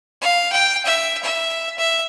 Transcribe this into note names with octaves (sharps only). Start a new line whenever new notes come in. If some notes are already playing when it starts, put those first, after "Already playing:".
F5
G5
E5
E5
E5